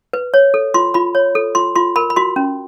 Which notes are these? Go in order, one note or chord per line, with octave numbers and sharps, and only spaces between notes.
B4
C#5
A4
F4 C6
F4 B5
C#5
A4
F4 C6
F4 C6
A#4 B5
B5
F#4 C6
C#4